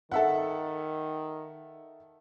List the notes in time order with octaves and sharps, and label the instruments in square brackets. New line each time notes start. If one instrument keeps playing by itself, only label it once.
[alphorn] D#3 [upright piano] A4 E5 F#5